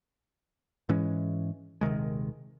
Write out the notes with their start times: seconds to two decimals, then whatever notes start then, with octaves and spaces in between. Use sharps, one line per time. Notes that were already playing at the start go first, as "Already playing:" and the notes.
0.89 G#2 E3 G#3 C#4
1.81 D#1 C3 D#3 G#3